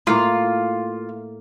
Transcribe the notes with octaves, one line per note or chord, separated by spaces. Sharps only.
A2 A#3 F4